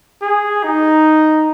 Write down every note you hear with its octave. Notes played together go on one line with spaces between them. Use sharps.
G#4
D#4